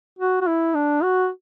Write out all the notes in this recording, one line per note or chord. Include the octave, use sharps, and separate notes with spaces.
F#4
F#4
E4
D4
F#4